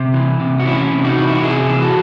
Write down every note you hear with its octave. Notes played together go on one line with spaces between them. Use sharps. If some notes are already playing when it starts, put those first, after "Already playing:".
Already playing: C3
E3
C3
F#4
E3 C#4 E4
C3
D#4 F#4
E3
E4
F#4
C3 E4 G#4
E3
F#4 A4